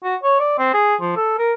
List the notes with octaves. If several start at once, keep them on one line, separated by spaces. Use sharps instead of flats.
F#4
C#5
D5
C4
G#4
F3
A4
A#4